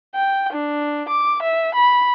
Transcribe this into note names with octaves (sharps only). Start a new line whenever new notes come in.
G5
D4
D6
E5
B5